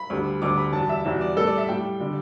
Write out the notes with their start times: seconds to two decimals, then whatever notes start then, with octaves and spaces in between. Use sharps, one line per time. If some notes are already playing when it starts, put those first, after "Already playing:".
Already playing: B5
0.10 D2 D3 G3
0.42 D2 D3 G3 D6
0.58 B5
0.73 E2 B2 G3 A5
0.89 E5
1.05 E2 B2 G3 E5
1.21 D5
1.36 A2 G3 A4
1.47 D5
1.58 E5
1.69 A2 G3 G5
2.00 D3 G3